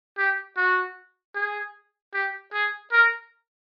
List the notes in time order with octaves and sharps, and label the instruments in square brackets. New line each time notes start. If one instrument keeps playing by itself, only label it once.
[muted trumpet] G4
F#4
G#4
G4
G#4
A#4